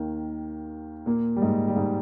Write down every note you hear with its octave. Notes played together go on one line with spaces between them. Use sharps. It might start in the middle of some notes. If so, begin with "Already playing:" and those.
Already playing: D#2 D#3
A#2 A#3
G3
G#2 G#3
G3
G#2 G#3